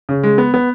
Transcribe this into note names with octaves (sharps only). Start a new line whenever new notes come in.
C#3
G#3
B3
B3